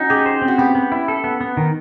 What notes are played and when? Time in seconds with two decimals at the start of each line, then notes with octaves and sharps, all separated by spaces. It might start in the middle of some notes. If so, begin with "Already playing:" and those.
Already playing: C#4 D#4 F#4
0.10 G4 G#4
0.26 C5
0.42 C4
0.48 F#4
0.58 B3 G4
0.75 B3
0.92 E4
1.08 A4
1.24 B3
1.41 B3
1.57 D#3